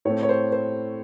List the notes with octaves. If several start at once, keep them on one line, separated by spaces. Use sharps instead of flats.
A2 A3 C4 C#5
C#5
C5
C5